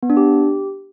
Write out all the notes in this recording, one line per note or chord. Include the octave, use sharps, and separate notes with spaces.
B3
D4
G4